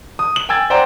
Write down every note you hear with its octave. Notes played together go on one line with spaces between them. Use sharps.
D#6
F#7
G5 G#5 E6 G#6 A6
C5 D5 F#5 G5 A#5 C6